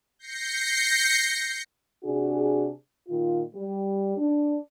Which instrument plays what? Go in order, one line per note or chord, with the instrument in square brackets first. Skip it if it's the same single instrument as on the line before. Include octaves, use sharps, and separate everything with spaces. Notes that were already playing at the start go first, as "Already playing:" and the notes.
[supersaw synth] G6 A#6 C7 C#7
[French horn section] C3 D4 F#4 G#4
A#2 D#3 F4
G3
D4